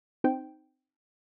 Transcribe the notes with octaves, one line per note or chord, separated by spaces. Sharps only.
C4 D#4 C5 G5